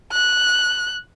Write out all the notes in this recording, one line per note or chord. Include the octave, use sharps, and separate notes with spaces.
F#6